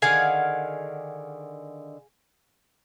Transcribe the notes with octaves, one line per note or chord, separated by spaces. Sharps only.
D3 D#3 G#4 F5 F#5 G#5